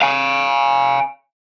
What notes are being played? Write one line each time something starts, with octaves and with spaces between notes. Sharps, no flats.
F5 G#5